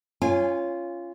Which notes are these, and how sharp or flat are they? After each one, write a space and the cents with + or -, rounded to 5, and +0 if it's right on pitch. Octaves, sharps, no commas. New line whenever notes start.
C#4 +0 F4 -15 G#5 -30